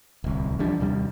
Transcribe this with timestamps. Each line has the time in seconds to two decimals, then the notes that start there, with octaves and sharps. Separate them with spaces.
0.24 D1 C2
0.59 E3 F3 G3 D4
0.80 D#2 C3 G3